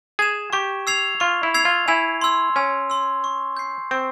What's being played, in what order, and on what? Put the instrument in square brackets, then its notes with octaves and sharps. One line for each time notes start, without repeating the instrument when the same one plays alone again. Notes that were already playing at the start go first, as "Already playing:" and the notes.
[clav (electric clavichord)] G#4 [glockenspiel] G#6 E7
[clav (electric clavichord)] G4 [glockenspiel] C#6
[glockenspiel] E6 G#6 C7 F7
[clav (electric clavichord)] F4 [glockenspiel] C#6
[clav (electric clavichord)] E4
[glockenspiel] E6 G#6 C7 F7
[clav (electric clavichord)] F4
[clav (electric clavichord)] E4 [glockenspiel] G#5
[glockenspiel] C6 E6
[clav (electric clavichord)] C#4 [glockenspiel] G#5
[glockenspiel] C6 E6
C#6
G6 C7
[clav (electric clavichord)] C4 [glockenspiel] C#6